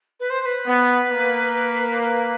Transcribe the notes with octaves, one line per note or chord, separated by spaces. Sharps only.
B4
C5
C5
B4
B3
A#3
B4